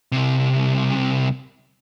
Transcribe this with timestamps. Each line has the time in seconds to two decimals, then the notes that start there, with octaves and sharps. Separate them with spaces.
0.12 C2 C3